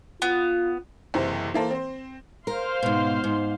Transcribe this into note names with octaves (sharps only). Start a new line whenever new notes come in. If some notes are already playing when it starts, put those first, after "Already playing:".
B3 F4
F#1 C3 E3 C5
E3 A#3 A4 C5
C4 C5
A#4 C5 F5 C6
G#2 B2
G#2